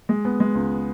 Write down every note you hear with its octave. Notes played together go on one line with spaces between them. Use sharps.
G#3
B3
G#3
C#2